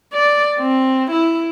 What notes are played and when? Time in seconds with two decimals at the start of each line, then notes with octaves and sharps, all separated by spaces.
0.13 D5
0.59 C4
1.11 E4